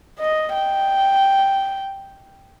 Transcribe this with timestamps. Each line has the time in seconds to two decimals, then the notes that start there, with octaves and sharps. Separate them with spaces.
0.20 D#5
0.55 G5